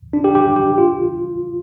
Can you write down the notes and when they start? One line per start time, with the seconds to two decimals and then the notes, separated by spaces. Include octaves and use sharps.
0.13 D4
0.24 G4
0.35 G4
0.56 G4
0.78 F4